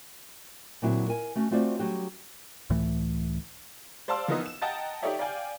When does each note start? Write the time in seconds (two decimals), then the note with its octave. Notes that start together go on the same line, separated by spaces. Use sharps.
0.82 A#2 D3 F#3 C4 E4 F#4
1.08 A#4 G#5
1.35 A3 C#4 F#4
1.51 A3 C4 F4 F#4 C5 D5
1.79 F#3 G3 A3 C#4 F#4 G4
2.70 C#2 A2 E3 A3
4.08 C5 D5 F5 A5 C6 E6
4.28 E3 F3 A#3 B3 D#4 D#5
4.46 E7
4.62 D#5 F#5 G5 A5 A#5 A6
5.02 D#4 G4 A4 C#5 D5 E5
5.19 D5 F5 G5 G#5 G6